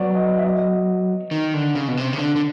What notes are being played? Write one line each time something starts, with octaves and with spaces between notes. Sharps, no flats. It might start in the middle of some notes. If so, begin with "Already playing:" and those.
Already playing: F#3 B4 C#5 D5
D#5
E5
D#5
D#3
D3
C#3
B2
C3
C#3
D3
D3